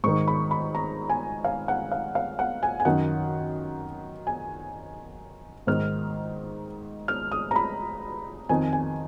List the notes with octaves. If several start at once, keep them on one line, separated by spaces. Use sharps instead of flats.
G#2 D#3 C#6
B5
B5
A#5
G#5
F5
F#5
F5
F5
F#5
G#5
G#5
F#2 D#3 F#5
G#5
G#2 D#3 F6
F6
D#6
A#5
B5
F2 D#3 G#5
G#5